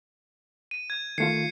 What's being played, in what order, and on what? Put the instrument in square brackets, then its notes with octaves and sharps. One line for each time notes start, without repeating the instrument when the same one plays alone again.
[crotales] D#7
G#6
[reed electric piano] D#3 A3 F4 [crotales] G#6 C7 C#7